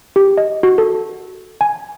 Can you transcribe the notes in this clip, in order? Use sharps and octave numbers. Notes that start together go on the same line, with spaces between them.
G4
D#5
F#4
A4
G#5